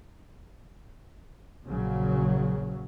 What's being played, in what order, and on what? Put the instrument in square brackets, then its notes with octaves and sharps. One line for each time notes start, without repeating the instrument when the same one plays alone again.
[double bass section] A#1 C#3 F#3